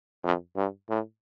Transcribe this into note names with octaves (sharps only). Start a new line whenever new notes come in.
F2
G2
A2